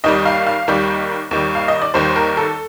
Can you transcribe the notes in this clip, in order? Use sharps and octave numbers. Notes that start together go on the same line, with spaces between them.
D#2 D#3 G3 D#5
F5
F5
D#2 D#3 G3
D#2 D#3 G3
F5
D#5
D5
D#2 D#3 G3 C5
A#4
A4